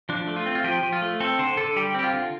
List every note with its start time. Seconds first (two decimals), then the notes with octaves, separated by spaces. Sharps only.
0.09 F3 D4
0.27 A3
0.37 F4
0.46 C4
0.55 F4
0.64 F3 G4
0.83 F3
0.93 F4
1.02 A3
1.20 C4 A4
1.39 D3 C5
1.57 D3 A4
1.76 G3 G4
1.94 C4 G4
2.04 F4
2.13 D3